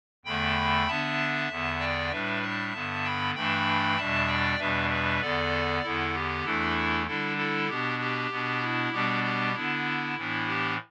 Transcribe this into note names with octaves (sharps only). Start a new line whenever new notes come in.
E2 D3 A3 G5 B5
D3 B3 D4 E5 A5
E2 D3 B3
D5 G5
A2 G3 D4 B4 E5
E5 A5
G2 D3 B3
G5 B5
G2 E3 A3 D4 G5 B5
E2 B2 G3 D4 E5 A5
D5 G5
E2 B2 G3 D4 B4 E5
B4 E5
E2 D3 B3 A4 D5
E2 D3 B3 E4 A4
G4
E2 E3 A3 D4 E4 A4
D3 G3 D4 E4 A4
E4 A4
B2 B3 D4 G4
G4
B2 B3 D4
E4
B2 G3 B3 D4 G4
G4
D3 B3 D4 E4
A2 E3 B3 D4
G4